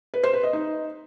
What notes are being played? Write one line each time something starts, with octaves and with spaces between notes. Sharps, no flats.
B4
C5
B4
D#5
D#4